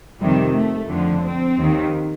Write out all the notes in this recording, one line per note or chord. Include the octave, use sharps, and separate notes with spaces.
F2 C3 D#3 G3
A3
F2 D3 F3
C4
D#2 D#3